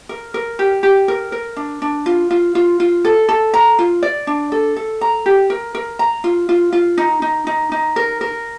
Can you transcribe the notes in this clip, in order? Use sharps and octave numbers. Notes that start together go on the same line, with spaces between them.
A#4
A#4
G4
G4
A#4
A#4
D4
D4
F4
F4
F4
F4
A4
A4
A#5
F4
D5
D4
A4
A4
A#5
G4
A#4
A#4
A#5
F4
F4
F4
D#4
D#4
D#4
D#4
A#4
A#4